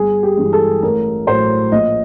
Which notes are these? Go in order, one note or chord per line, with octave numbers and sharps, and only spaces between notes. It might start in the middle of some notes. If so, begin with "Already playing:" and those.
Already playing: G1 G#4
G4
G2 E3 G#3
A4
A1 A#4
A2 F#3 C5
A#1 D#5